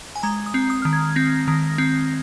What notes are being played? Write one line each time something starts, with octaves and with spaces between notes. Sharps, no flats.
G#5
G#3 A#5
D#6
C4
D#6
D#3 F6
G#6
C4 A#6
D#3
C4